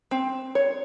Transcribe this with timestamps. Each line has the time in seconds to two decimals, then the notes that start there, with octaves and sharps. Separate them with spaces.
0.11 C4
0.55 C#5